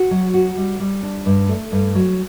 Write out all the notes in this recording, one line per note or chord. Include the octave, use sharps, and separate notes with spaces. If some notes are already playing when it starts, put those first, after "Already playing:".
Already playing: F#4
F#3
F#4
G3
G3
D4
G2
A3
G2
F#3